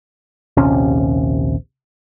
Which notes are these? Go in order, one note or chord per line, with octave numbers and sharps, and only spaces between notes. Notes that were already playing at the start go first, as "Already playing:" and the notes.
A#1 D#2 C3 C#4